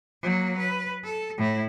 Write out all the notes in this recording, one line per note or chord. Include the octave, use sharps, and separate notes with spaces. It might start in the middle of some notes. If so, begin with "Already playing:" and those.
F#3 A#3
B4
A4
A2 E4